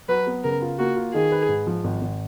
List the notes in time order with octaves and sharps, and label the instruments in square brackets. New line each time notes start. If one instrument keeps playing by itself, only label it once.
[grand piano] F#3 [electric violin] B4
[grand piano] B3
[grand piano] C#3 [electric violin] A#4
[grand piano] F4
[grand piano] A#3 [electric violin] F#4
[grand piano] F4
[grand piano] D#3 [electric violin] G#4
[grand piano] B4
G#2
F3
G#1
G#1